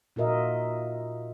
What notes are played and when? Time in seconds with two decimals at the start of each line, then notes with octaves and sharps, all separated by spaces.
0.16 A#2 F4 F#4 A#4 D#5 E5